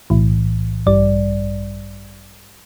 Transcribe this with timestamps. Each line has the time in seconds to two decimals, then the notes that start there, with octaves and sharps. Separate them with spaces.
0.10 B1 A2 E3
0.87 A1 G2 G3 D5